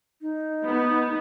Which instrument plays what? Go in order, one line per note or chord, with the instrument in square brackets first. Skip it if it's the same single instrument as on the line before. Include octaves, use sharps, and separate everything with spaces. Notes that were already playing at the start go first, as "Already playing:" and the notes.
[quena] D#4
[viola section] B3